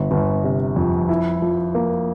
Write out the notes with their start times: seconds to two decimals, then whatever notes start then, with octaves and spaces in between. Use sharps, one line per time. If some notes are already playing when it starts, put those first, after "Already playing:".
Already playing: G1
0.11 G1
0.44 C3
0.76 F2
1.09 E4
1.42 F3
1.75 A#3